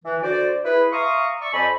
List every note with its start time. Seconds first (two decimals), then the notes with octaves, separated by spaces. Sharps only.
0.05 E3
0.23 D3 F#4 C5 D5
0.65 E4 G#4 B4
0.93 E5 F5 A#5 C6 C#6 D#6
1.41 D5 E5 C#6
1.53 F2 C5 D#5 G#5 A5 B5